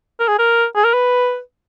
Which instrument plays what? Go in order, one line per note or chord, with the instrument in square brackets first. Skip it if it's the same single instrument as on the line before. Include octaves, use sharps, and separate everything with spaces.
[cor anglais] A#4
G#4
A#4
G#4
A#4
B4